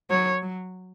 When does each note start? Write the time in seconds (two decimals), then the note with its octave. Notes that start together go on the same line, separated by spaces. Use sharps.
0.10 F#3 C#5
0.42 F#3